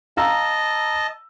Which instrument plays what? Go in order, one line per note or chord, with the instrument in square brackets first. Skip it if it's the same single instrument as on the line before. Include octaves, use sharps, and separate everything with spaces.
[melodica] D#5 A5 [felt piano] F5 A#5 E6